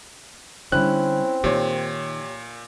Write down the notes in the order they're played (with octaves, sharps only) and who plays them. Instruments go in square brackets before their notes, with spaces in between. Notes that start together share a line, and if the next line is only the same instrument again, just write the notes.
[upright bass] D3 G3 [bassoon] C4 [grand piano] C#4 E4 [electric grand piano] F#6
[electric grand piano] A#2 [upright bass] D#3 [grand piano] G4 C#5